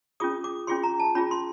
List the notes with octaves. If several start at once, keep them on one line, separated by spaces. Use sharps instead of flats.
C#4 F4 G#4 D#6
D6
C#4 F4 G#4 C6
A#5
A5
C#4 F4 G#4 B5
C6